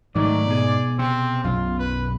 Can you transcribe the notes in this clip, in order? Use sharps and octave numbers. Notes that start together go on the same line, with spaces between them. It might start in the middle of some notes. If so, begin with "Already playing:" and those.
G#2 D#3 F#3 G#3 A3 D5
B2 G#4
C3 C4
B1 F#2 F4
B4